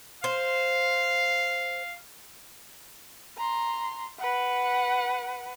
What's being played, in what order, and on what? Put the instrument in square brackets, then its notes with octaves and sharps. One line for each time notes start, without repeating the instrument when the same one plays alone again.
[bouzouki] C5 [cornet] F5
[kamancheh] A#5 C6
B4 F#5